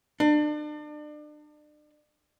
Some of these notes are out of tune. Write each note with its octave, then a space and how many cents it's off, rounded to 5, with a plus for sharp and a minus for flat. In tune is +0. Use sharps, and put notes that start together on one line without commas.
D4 +35